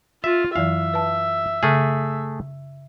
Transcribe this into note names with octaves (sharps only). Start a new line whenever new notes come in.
F4 E5
F#2 E3 F#3 E5 F5
B4 A5
C#3 A3 G#4 E6 F6